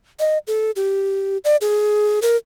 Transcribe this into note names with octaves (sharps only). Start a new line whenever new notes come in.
D#5
A4
G4
D5
G#4
A#4